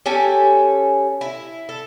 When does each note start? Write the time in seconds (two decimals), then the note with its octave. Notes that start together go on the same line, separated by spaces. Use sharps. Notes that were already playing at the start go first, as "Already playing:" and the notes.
0.06 C#4 G4 A4 G#5
1.21 E4
1.69 A4